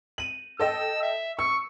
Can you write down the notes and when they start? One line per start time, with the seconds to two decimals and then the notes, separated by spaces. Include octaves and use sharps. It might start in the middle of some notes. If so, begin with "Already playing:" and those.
0.18 D#7 F#7
0.60 A4 D#5 G5 E6
1.02 E5
1.39 C#6 E6